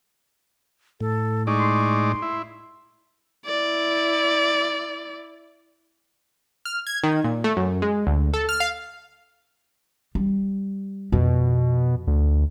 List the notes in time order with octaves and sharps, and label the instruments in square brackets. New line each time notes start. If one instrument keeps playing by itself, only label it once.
[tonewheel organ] A2 [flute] A4
[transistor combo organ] G#3 D#4 D5 [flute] C#6
[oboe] C6
[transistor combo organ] E4
[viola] E4 D5
[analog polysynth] F6
G#6
D#3
A#2
A3
F#2
G#3
D2
A4
F6
F5
[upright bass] G3
[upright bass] F2 [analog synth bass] B2
[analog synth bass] D2